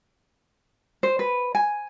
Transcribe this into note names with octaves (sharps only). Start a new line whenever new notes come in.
C5
B4
G#5